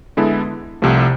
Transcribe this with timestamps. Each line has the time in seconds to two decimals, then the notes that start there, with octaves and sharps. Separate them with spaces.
0.17 D3 G#3 B3 E4 A4
0.82 C2 C3 F3 A3